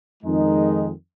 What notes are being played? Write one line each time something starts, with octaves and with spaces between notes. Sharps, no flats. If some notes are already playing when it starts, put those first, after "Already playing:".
F2 D#3 G#3 D#4